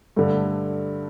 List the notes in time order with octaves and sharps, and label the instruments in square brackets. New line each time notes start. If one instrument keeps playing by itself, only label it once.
[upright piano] G2 D3 A3